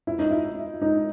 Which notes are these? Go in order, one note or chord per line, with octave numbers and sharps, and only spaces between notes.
E4
D#4
E4
D#4